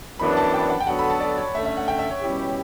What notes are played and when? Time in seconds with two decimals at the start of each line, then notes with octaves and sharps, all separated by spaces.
0.19 F#2 E3 B3 D4 B5
0.37 A5
0.54 G5
0.70 F#5
0.80 G5
0.87 D3 F#3 B3 F#4 A4 F#5
0.99 B5
1.10 A5
1.20 D5
1.37 C#5
1.54 D3 A3 C#4 E5
1.66 E5
1.77 F#5
1.88 G5
1.99 E5
2.11 C#5
2.21 B2 G3 C#4 E4 G4